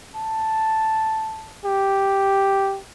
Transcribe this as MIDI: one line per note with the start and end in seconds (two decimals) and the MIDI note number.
0.16 1.56 81
1.65 2.79 67